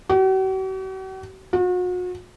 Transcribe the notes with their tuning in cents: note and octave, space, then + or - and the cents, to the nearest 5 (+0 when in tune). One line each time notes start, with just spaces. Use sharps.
F#4 +45
F#4 -40